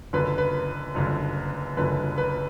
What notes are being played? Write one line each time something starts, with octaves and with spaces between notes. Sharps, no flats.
F#1 F#2 D3 B4
B4
F#1 F#2 D3
F#1 F#2 D3 B4
B4